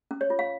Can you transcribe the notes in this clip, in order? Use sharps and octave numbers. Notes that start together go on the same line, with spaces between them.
C#4
C#5
F4
F5